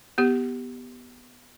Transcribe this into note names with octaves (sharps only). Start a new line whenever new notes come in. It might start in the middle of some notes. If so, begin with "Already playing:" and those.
B3 G4